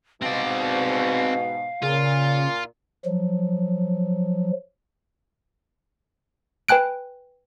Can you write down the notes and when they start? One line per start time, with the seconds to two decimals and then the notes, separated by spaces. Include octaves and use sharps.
0.22 G#2 B2 C4 D5 F5
1.82 A#2 C#3 F4
3.06 F3 F#3
6.69 B4 G5 G#5 F#6 D7